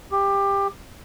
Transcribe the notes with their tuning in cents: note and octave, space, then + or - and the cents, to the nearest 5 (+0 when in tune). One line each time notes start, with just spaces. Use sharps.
G4 +20